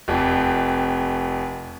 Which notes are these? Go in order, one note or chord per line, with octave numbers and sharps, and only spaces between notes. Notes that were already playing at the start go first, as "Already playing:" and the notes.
F1 F2